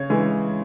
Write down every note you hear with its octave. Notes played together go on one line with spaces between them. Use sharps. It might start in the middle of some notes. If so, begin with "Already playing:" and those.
Already playing: C#3 C#5
E3 G#3